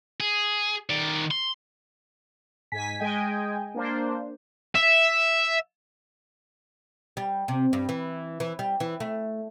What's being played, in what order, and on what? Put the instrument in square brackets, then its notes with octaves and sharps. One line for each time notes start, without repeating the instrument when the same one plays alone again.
[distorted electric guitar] G#4
D#3 D5
C6
[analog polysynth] G#2 G#5 B6
G#3 D#5 G5 G#5
A#3 D4 C5
[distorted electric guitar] E5
[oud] G3
C3
G2
E3
E3
G3
E3
A3